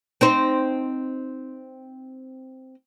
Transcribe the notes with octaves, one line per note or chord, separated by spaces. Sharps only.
C4 D#4 C5